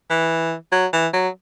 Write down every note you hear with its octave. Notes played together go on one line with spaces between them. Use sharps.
E3
F#3
E3
F#3